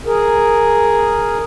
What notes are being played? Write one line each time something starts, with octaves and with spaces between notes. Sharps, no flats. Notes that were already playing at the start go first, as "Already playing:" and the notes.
G#4 A#4